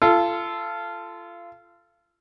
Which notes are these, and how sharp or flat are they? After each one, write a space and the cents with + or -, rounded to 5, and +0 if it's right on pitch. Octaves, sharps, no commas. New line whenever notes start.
F4 -25 A4 +0